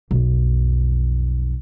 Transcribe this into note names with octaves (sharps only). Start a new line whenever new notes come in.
B1 F2